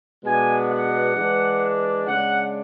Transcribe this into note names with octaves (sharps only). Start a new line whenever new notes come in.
B2 G#3 B3 D4 G#5
F#5
E3 G#3 D4
C#3 G#3 D4 F#5